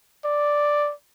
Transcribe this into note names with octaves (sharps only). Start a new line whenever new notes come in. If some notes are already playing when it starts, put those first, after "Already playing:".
D5